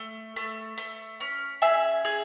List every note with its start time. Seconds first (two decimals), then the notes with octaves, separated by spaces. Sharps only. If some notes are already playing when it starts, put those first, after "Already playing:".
Already playing: A3
0.36 A3
0.78 A3
1.20 C#4
1.62 G#4 E5 G#5
2.05 G#4